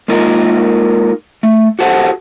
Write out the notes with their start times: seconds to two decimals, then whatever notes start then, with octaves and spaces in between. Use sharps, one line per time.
0.08 G#3 A#3 D#4 F4 A#4
1.43 A3
1.79 F#4 G4 A4 C5 F#5